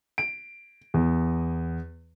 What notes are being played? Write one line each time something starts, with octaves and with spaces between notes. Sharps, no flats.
D7
E2